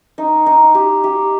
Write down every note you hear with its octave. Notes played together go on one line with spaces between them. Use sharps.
D#4
D#4
G4
G4